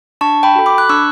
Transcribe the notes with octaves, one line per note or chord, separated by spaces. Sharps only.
D4 A5 C#6
G5 B5
F#4 A4
B5 D6
F#6
D4 C#6 E6